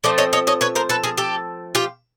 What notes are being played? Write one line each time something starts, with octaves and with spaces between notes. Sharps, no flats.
F3 A3 C4 C5 D5
C#5 D#5
C#5 D#5
C#5 D#5
B4 C#5
A#4 C5
A4 B4
G#4 A#4
G4 A4
F4 G4